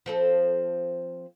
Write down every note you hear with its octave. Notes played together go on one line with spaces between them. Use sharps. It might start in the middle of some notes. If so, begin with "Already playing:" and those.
F3 C4 A4